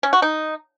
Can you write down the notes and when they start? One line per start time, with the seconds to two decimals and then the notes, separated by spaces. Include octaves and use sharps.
0.03 C#4
0.13 F#4
0.22 D#4